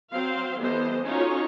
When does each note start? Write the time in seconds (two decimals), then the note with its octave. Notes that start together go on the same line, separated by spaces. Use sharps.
0.13 F#3 C4 C5 F5
0.59 E3 G3 B3 A4 C5 D#5
1.05 C#4 D#4 F4 F#4 A4 C#5